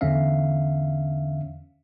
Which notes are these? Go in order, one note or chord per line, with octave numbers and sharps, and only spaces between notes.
E2 D3 C#4 E5 F5